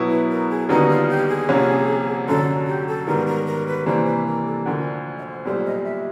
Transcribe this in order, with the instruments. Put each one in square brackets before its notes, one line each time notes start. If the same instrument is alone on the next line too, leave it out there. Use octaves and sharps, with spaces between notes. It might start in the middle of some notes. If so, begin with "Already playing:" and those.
Already playing: [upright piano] B2 F#3 B3 E4
[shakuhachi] B4
A#4
G#4
[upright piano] D#2 D3 G3 B3 D#4 [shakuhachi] F#4
[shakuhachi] F4
G4
G#4
[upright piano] C2 C3 F3 A#3 C#4
[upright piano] F#2 D3 F#3 [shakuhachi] A4
[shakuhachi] G4
A4
[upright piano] G#2 D#3 G3 B3 [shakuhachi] A#4
[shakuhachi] A#4
A#4
B4
[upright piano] C3 E3 G3 A#3 D4 [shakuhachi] C5
[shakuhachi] B4
A#4
A4
[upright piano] D2 D3 F3 [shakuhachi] A#4
[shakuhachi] D#5
C5
[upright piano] B1 A#2 G3 [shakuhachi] C5
[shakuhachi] D#5
E5